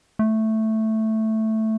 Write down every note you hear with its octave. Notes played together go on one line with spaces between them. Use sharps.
A3